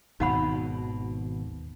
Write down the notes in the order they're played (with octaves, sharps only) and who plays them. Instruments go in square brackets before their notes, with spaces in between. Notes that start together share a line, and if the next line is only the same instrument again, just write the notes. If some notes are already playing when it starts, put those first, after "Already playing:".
[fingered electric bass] G#1 D#2 B2 [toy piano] D#4 F#5 B5